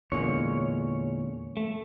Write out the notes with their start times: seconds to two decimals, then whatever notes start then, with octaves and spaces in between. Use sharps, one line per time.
0.12 E2 A#2 D3 G#3 C#4 C#5
1.57 A3